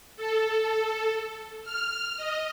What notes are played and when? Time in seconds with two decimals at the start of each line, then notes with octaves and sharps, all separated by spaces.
0.17 A4
1.64 F6
2.17 D#5